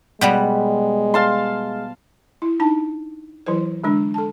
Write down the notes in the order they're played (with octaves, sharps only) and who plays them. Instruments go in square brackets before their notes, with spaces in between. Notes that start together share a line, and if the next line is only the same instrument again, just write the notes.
[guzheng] B2 G3 B3 [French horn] G#3
[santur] F5 A5 C6
[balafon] E4
D4 D#4 A5
E3 F#3 E4 B4 C5
D3 G#3 D4
A4 A5